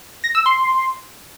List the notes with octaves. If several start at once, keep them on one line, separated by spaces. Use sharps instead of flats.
A#6
E6
C6